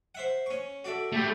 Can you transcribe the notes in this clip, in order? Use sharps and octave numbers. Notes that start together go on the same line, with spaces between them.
C5 E5 F#5
C#4 C#6
F#4 A4 D5 E5
A3 E4 G4